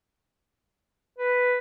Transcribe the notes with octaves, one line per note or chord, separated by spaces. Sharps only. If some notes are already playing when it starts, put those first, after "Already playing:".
B4